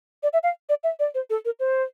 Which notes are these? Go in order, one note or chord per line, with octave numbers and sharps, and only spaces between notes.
D5
E5
F5
D5
E5
D5
C5
A4
A#4
C5